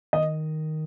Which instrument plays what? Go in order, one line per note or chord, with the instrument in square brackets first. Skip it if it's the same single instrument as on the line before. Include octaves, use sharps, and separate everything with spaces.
[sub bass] D#3 [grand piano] D#5